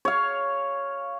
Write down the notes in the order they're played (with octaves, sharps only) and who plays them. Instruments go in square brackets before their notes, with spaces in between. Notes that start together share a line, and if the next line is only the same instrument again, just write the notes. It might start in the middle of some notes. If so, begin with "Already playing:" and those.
[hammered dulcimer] C#5 F5